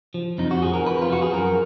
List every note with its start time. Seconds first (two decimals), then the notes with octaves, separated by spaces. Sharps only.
0.14 F3
0.38 F2 D#4
0.51 F#4
0.62 F3 G#4
0.74 A#4
0.86 F2 B4
1.02 F4
1.10 F3 F#4
1.22 G#4
1.33 F#2 A#4